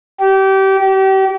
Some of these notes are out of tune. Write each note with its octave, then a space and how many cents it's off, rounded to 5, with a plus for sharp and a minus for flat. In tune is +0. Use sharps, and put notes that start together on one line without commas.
G4 -25
G4 -35